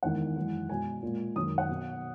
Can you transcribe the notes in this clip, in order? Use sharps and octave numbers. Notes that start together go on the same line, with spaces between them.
E2 D#3 G#3 F#5
F#2 E3 G#3
B2 G#3 G#5
A#2 G#3
F#2 D#3 G#3 D#6
F#5
B2 F#3